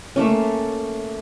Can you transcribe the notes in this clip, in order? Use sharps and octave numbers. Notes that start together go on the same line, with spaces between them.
A3 A#3 C#4